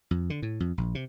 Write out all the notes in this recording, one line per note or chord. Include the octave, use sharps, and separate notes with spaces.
F2
D3
A2
F2
A#1
C3